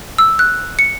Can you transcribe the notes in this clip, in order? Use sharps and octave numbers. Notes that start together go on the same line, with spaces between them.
E6
F#6
C#7